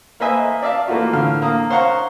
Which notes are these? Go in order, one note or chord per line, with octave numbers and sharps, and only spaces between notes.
A#3 B4 C5 D#5 E5 G#5
D5 E5 F5 A5
E3 A3 A#3 F4 F#4
A2 D3 F5 F6
A#3 A#5 D#6
C5 C#5 F5 F#5 A#5 C#6